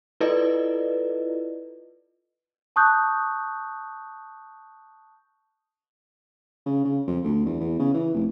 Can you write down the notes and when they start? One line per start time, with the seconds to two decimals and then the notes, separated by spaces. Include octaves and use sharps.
0.21 E4 F4 A4 B4 D5 D#5
2.76 A5 C#6 D#6 F#6 G6
6.66 C#3
6.85 C#3
7.07 F2
7.24 D2
7.46 E2
7.60 E2
7.79 C#3
7.94 E3
8.14 F1